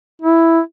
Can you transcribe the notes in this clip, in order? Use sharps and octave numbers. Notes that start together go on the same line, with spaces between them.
E4